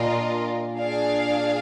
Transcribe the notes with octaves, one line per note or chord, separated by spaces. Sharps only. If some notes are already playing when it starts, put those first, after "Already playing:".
Already playing: A#2 D4 F4 A#4 D#5
D4 G#4 D5 F5